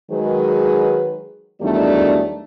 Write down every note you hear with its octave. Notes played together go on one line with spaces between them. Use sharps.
D#3 F#3 G#3 G#4 B4
E2 D#3 F#3 G3 A3 D4